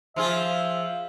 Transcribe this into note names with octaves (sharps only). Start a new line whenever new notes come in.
F3 F4 G#4 E5